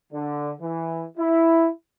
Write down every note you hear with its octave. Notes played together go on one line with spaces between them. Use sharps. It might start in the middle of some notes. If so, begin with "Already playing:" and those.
D3
E3
E4